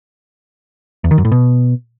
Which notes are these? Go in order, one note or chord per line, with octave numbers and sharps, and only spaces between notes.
E2
D#3
F#2
A2
B2